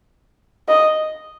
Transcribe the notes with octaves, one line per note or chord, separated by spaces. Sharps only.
D#5